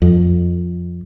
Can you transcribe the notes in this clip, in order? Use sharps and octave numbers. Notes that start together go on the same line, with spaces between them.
F2